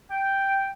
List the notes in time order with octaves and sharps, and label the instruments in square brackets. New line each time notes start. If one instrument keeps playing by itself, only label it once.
[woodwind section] G5